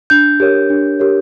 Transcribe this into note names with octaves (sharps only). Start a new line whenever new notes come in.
D4 G6
G4 A#4 C#5
D4
G4 A#4 C#5